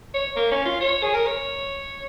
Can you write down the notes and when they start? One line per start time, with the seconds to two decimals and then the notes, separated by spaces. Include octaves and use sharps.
0.14 C#5
0.36 A#3
0.51 C#4
0.65 F4
0.80 C#5
1.03 G#4
1.14 A#4
1.27 C#5